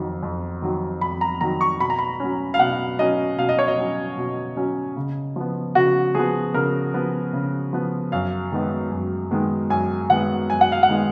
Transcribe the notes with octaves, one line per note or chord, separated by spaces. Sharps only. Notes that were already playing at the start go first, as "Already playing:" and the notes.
Already playing: F2 D#3 F#3
F2
D#3 F#3
F2 B5
A#5
D#3 F#3 A#5
C#6
B2 B5
A#5
B5
F#3 C#4
F5
B2 F#5
F#3 C#4 D#5
B2 F5
D#5
C#5
D#5
F#3 C#4
B2
F#3 C#4
C#3
F3 B3
C#3 F#4
F3 B3 G#4
C#3 A#4
F3 B3
C#3
F3 B3
F#2 F5
D#3 G#3 B3
F#2
D#3 G#3 B3
F#2 G#5
D#3 G#3 B3 F#5
F#2 G#5
F#5
F5
F#5
D#3 G#3 B3